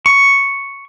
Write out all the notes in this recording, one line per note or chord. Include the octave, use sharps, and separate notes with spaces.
C#6